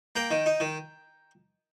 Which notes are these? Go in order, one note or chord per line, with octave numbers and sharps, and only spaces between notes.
A#3 G5 A#5
D#3
D#4
D#3